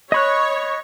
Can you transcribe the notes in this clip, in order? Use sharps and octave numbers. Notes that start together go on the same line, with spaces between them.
C#5 D#5 B5 F#6